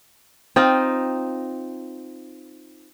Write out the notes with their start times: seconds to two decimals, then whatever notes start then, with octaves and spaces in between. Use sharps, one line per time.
0.56 C4 D#4 F4